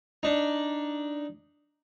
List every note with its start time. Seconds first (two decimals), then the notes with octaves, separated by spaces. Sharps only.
0.23 D4 D#4